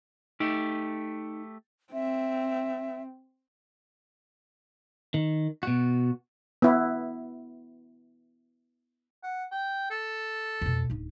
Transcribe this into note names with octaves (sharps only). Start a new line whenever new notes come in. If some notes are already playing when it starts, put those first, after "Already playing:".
A3 D#4 G4
C4 E5
D#3
B2 F#4
B3 E4
F#5
G5
A4
F2 B2
D1 D#4